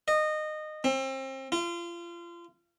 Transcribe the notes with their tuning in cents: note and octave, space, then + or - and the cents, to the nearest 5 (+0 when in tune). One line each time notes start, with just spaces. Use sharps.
D#5 -20
C4 +30
F4 -30